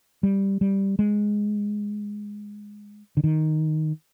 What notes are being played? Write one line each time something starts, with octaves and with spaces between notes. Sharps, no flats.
G3
G3
G#3
D3
D#3